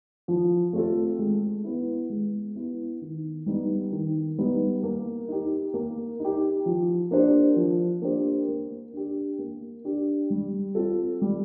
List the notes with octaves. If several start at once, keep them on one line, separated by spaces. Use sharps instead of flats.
F3
A3 C4 F4 A4
G#3
B3 E4
G#3
B3 E4
D#3
G3 B3 D#4
D#3
G3 B3 D#4
A#3
D#4 G4
A#3
D#4 G4
F3
A#3 D4 G4 C5
F3
A#3 D4 G4 C5
A#3
D4 G4
A#3
D4 G4
G3
C4 F4 A4
G3